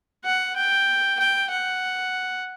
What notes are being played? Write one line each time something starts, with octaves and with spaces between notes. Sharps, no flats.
F#5
G5
G5
F#5